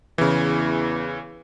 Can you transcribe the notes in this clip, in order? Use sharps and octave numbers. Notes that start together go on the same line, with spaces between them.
E2 C#3 E3